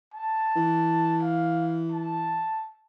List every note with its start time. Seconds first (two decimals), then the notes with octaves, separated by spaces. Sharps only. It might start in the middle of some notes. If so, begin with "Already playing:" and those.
0.14 A5
0.56 E3
1.22 F5
1.92 A5